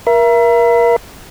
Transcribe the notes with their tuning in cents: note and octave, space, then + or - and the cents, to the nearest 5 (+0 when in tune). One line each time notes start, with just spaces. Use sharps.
A#4 +25 E5 +35